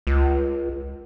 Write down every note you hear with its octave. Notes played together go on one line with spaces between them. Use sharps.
C#2